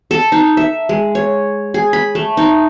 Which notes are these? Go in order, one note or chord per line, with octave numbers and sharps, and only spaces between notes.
A4
D#4
E5
G#3
C#5
G#4
B5
A3
D#4